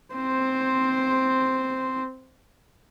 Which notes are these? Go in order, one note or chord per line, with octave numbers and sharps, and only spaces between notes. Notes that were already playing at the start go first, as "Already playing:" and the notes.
C4 C5